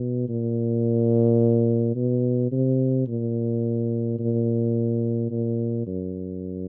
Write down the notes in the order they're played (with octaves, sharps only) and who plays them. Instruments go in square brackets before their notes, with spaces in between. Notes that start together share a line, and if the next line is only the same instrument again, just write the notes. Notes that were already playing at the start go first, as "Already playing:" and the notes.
Already playing: [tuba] B2
A#2
B2
C3
A#2
A#2
A#2
F#2